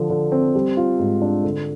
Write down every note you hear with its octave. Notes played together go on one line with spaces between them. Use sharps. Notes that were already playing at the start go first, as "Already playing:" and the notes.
Already playing: D3 F3
D3
C4
G3
F4
G#2
D4
D3